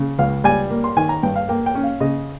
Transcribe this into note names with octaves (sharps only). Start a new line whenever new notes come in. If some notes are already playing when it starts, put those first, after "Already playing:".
Already playing: C#3
C#2 F5
G3 G#5
A#3
C6
D#3 G#5
A#5
G2 G5
F5
A#3 G5
G5
C#4
F5
C#3 D#5